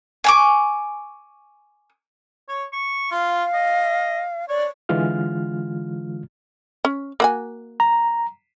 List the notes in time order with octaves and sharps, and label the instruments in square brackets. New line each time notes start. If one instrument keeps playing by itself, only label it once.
[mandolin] G#5 C#6 D6
[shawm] C#5
C#6
[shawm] F4 [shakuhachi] F5
[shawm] D#5
[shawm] C#5 [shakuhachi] D5
[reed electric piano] D3 E3 G#3 F4 F6
[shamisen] C#4
A#3 F#4 G#5
[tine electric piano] A#5